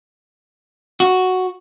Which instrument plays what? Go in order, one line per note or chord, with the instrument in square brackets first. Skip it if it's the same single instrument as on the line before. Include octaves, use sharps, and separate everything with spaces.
[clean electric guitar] F#4